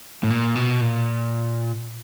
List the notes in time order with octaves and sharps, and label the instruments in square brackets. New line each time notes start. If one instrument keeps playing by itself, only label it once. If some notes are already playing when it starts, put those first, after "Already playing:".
[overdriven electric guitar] A2
A#2
B2
A#2